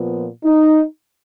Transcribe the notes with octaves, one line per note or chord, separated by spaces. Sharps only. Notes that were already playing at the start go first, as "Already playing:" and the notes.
Already playing: A#2 F3 B3
D#4